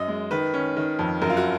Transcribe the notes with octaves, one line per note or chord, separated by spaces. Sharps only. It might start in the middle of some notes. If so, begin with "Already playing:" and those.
Already playing: F#2 D#5
G#3
D#3 B4
C#4
D#3
F2
F#2 A#4
F4
F#4